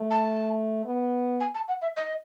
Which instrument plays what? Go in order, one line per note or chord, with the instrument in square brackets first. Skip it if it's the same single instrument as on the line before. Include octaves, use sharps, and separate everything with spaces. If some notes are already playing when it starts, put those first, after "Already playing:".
Already playing: [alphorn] A3
[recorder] A5
[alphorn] B3
[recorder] G#5
A5
F#5
E5
D#5